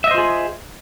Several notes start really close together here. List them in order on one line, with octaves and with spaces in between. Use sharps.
E5 D#5 C5 F4 G#4